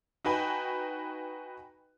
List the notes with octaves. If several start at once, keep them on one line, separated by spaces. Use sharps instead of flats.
D#4 F#4 B4 G5 G#5